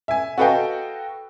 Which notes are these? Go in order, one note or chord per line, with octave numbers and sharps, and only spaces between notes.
E5 G#5
F#4 A4 B4 D#5 F5 G5